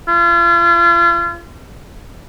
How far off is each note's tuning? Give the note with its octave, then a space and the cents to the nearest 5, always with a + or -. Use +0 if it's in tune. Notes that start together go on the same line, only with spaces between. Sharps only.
F4 -40